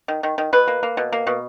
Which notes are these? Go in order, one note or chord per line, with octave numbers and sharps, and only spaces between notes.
D#3
D#3
D#3
B2 B4
A#3
A#3
B2
A#3
B2